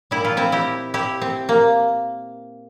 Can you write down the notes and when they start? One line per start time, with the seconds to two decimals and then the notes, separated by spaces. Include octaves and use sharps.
0.11 A#2 G3 E4
0.25 F4
0.37 C4 E4
0.52 E4 G4
0.94 E4 G4
1.22 C4
1.49 A#3